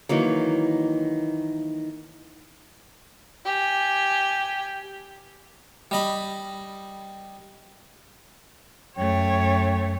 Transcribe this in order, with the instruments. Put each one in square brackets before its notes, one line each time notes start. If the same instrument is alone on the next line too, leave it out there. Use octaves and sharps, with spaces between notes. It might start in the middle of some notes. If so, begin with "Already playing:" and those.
[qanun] D#3 E3 F#3 A#3
[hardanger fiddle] G4 G#5
[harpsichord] G3 D#5 B5
[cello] F#2 A3 [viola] C#5 [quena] G5